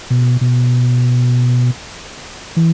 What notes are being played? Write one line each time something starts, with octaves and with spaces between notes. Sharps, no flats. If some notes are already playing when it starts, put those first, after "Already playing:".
B2
B2
E3